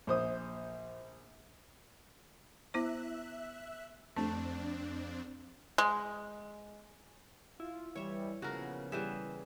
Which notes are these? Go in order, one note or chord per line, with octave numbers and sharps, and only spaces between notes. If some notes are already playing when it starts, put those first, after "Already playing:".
A#1 C5 D#6
B3 E4 C5 E5 F#6
F2 A3 C4 D4
G#3
E4 F4
E3 G3 C#5 E5
A#2 C#3 F3 B3 F#4 A4 A#4
E3 G3 G#4 E5